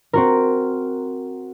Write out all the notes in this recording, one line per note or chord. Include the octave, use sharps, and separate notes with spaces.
C4 F#4 A#4